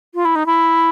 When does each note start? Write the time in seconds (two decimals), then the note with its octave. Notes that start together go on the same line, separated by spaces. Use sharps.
0.15 F4
0.25 E4
0.35 D#4
0.46 E4